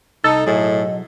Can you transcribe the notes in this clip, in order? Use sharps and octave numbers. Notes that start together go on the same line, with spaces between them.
C2 D#4 A4 D#5
B1 A2 F#3 G#4 D#5